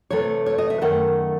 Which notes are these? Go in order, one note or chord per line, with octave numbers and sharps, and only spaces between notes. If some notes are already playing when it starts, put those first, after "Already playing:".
C3 E3 A3 C#5
C#5
D#5
E5
F#2 D#3 A3 F#5